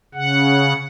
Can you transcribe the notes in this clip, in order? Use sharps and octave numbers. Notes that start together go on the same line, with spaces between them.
C#3 F#5